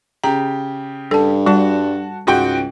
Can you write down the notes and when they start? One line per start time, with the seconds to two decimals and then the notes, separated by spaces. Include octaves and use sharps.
0.24 C#3 G4 A#5
1.11 G2 A4 A5
1.46 G3 F#4 A5
2.27 C#2 G#2 F#4 G5